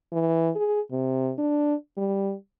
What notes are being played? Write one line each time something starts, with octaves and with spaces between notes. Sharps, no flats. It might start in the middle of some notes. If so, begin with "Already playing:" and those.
E3
G#4
C3
D4
G3